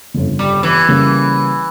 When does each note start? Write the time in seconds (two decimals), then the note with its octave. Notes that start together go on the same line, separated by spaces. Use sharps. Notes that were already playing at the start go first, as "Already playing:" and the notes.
0.14 G1 F2 C#3
0.39 G3
0.63 E3
0.88 C#3 G3 A#3 C#4